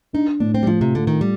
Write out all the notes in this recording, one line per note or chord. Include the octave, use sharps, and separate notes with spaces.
D4 D#4
A2 D4
C4
G3
F3 F4
C3
D3 A3
D#3
G3